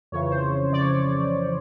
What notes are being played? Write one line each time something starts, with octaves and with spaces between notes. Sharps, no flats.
F2 C#3 E3 C#5
C5
D5
C#5